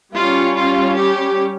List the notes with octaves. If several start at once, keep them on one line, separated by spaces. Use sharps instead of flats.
G3 C#4 F4
F4
G4